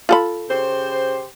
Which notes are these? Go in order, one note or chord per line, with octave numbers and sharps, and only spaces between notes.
F4 A4 B5
C#3 G4 C5